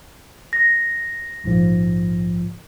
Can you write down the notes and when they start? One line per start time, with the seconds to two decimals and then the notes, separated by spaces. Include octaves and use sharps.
0.53 A#6
1.44 A#1 G#2 F3